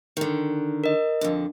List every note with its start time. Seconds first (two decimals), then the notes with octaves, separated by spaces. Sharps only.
0.17 D3 D#3
0.84 A#4 D#5
1.21 F2 D3